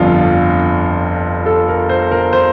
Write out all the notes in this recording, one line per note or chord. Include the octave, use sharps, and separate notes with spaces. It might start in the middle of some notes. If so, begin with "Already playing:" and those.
Already playing: G1 F2 D3 F3 F4
A4
A#4
C5
A#4
C5